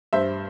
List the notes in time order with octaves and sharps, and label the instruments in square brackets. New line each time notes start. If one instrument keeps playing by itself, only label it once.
[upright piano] G2 C5 E5